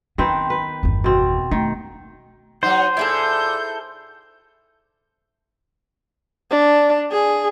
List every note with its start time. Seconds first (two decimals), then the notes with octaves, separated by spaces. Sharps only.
0.18 D#3 B3 C4 B4
0.50 B4
0.83 G1 E2
1.04 B2 C4
1.51 D#3 A3
2.63 F#3 D#4 C5 F#5
2.97 A#2 E4 G#4 A4 G6
6.51 D4
7.12 G#4